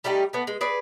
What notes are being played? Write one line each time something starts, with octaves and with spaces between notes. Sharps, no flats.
G3 A3 D#4 G4
A3 B3
G#3
G#4 B4 D5